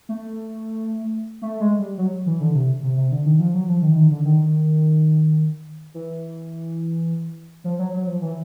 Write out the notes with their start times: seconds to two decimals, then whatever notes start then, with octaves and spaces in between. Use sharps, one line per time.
0.09 A3
1.42 A3
1.60 G#3
1.79 G3
1.98 F#3
2.26 E3
2.40 D3
2.54 C3
2.83 C3
2.97 C3
3.11 D3
3.26 D#3
3.39 F3
3.54 F#3
3.68 F3
3.82 D#3
3.90 E3
3.96 D#3
4.11 D3
4.25 D#3
5.94 E3
7.64 F3
7.79 F#3
7.93 F#3
8.07 F3
8.22 E3